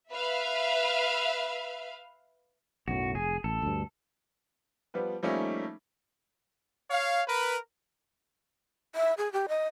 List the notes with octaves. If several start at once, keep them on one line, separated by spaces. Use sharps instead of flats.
B4 E5 F5
B1 F#2 A2 F#4
F1 G#4
A1 A4
D2 G2
F3 G3 B3 F4 B4
F3 G3 A3 A#3 C#4 D#4
C#5 F5
A#4 B4
E5
G#4
G4
D#5